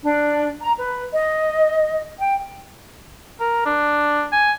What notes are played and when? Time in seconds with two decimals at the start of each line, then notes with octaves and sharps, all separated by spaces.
0.03 D4
0.61 A#5
0.78 B4
1.12 D#5
2.19 G5
3.40 A#4
3.66 D4
4.32 G#5